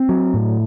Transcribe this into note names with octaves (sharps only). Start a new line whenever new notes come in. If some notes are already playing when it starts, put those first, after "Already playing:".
Already playing: C4
F#3
A2